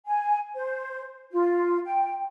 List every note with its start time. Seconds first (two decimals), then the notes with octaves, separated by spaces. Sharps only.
0.06 G#5
0.55 C5
1.32 F4
1.85 G5